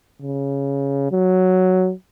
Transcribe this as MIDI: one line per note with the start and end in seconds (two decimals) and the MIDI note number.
0.22 1.09 49
1.12 1.92 54